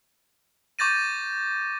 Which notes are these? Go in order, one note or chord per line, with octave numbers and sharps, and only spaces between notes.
C#6 D6 G6 A6 A#6 D#7